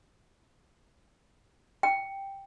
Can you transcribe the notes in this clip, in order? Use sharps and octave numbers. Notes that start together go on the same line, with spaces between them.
G5